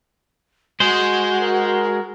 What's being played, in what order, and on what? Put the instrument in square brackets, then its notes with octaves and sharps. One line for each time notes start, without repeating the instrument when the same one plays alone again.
[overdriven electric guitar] G#3 G#4 [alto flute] F#4 [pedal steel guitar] C5
[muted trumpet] A#4